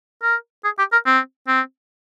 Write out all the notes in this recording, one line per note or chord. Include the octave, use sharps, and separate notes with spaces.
A#4
G#4
G4
A#4
C4
C4